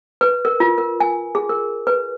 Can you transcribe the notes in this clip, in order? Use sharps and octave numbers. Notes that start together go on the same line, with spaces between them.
B4
A#4
F4
A#4
G#5
G#4
A#4
B4